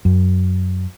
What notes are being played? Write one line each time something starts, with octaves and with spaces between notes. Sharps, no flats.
F#2